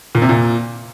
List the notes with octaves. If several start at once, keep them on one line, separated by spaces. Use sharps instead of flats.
A#2
C3
A#2